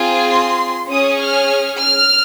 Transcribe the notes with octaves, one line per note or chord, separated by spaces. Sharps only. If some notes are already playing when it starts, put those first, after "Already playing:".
Already playing: C4 F4 G#4
C6
C#4 G#4 D#6
F6
F6